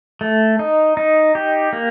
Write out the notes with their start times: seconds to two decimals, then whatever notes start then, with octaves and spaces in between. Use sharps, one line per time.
0.21 A3
0.59 D#4
0.97 D#4
1.35 G4
1.73 A#3